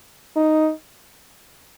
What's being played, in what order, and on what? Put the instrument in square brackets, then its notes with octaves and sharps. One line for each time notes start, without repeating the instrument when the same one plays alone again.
[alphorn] D#4